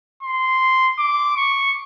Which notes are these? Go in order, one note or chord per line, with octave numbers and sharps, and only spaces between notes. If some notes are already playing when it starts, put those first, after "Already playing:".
C6
D6
C#6